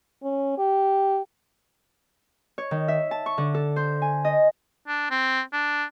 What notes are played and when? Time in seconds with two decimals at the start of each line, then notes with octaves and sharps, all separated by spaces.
0.23 C#4
0.58 G4
2.58 C#5
2.71 D#3
2.88 E5
3.11 A5
3.26 C#6
3.38 D3
3.54 A4
3.76 C5
4.02 G#5
4.25 D#5
4.88 D4
5.10 C4
5.53 D4